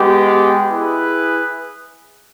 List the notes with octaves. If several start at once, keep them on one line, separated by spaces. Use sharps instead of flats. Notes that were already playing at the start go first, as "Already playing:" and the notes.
Already playing: G#3 B3 G4
E4 G#4 B4